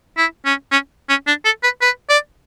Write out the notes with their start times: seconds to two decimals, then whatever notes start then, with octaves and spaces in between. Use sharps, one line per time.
0.17 E4
0.45 C#4
0.72 C#4
1.09 C#4
1.27 D4
1.45 A4
1.63 B4
1.81 B4
2.09 D5